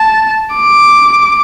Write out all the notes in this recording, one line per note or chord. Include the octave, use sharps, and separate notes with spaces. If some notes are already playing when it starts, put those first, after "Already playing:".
Already playing: A5
D6